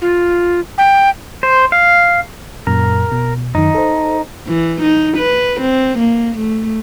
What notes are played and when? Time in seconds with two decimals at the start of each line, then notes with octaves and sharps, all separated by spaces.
0.01 F4
0.78 G5
1.43 C5
1.72 F5
2.67 F#2 A#2 A#4
3.12 B2
3.55 F#2 D#3 D#4
3.75 A4 C5
4.47 E3
4.82 D#4
5.17 B4
5.61 C4
5.99 A#3
6.38 A3